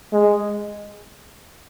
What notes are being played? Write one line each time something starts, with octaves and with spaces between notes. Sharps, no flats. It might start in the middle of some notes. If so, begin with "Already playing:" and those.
G#3